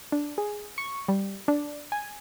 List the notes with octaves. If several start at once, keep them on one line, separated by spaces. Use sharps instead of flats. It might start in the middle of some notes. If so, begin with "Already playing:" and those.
D4
G#4
C#6
G3
D4
G#5